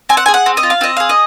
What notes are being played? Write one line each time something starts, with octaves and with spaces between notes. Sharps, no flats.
C4 G#5
F#5
G#5
G#4
F#5
C4
D#5
F4
F5
C4 D#5
G#4 F5
D#5